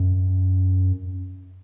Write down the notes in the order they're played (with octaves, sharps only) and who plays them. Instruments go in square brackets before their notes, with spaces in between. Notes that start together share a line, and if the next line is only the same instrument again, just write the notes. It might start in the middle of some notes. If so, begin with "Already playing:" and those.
Already playing: [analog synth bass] F#2